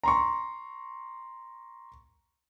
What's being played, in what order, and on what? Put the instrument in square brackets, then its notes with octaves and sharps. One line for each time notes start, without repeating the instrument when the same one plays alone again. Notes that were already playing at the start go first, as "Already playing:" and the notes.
[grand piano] A#5 C6 C#6